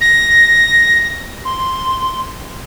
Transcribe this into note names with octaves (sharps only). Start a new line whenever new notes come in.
A#6
C6